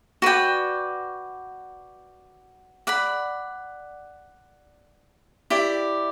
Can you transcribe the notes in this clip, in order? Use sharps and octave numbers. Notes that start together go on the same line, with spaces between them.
F#4 B4 D5 G5
D5 F#5 B5
E4 G4 D5